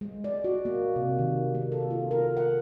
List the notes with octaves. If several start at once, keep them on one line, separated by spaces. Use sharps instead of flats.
G#3
D5
F#4
A#3
C3
D#3
A#3
A4
F4
A#4
F#5